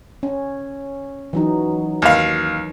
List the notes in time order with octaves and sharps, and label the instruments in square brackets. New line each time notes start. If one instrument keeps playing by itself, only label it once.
[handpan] C#4
E3 F#3 D#4
[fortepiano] D#2 F5